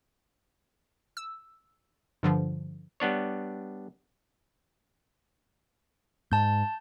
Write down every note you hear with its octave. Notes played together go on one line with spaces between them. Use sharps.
E6
G2 D3 F3
G3 B3 D4 C#5
G#2 A5 G6